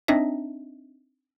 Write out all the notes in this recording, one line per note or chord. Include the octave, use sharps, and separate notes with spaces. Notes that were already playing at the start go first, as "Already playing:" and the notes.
C4 D4 D#4 D#5 E5